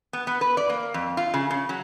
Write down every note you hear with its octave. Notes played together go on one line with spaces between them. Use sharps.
B3
B3
B4
D5
A#3
F2
F4
C#3
C#3
F#3